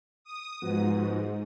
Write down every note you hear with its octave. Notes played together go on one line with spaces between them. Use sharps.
D#6
G#2 F3 B3 F#4